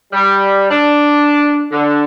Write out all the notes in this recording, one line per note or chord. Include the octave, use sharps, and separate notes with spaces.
G3
D4
D3